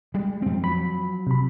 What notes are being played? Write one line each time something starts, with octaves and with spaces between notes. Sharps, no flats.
G3 G#3
F2 C4
F3 F#3 B5
C3 B5